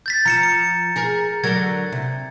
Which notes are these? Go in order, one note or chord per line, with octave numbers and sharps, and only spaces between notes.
G6 A6 B6
F3 A#5 C#7 E7
C#7
G#4 A#4
D3 F#3 A#4 G#6
C3